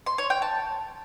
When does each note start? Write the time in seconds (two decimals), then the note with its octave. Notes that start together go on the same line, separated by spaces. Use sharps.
0.06 C6
0.18 C#5
0.30 G5
0.42 A5